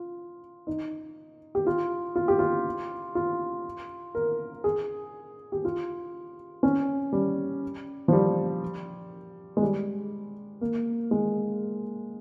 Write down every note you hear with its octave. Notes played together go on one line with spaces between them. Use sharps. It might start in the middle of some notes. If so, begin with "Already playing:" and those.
Already playing: F4
D#4
G4
F4
F4
G4
F4
F4
A#4
G#4
G4
F4
C#4
G3
F3
G3
G#3
G3
A#3
G#3